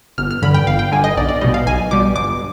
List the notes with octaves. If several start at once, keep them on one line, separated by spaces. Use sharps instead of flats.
G1 F6
F6
G2 D3 B5
G5
G1 F5
G5
G2 D3 G#5
D#5
B1 D5
D5
B2 G3 D#5
F5
B1 G#5
B2 G3 D6
G1 D6